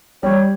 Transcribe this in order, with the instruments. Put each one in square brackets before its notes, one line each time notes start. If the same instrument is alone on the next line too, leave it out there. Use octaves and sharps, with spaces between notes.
[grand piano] G3 [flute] C#5